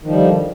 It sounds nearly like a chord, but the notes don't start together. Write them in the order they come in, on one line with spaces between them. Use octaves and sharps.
D#3 F3 G3 D3